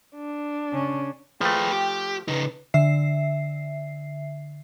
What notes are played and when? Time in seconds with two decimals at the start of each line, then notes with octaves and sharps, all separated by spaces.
0.14 D4
0.72 C#3 C#4
1.41 F3 A3 G#4 B4 G5
1.72 G4
2.28 C#3 D#4 B4
2.74 D3 E5 C7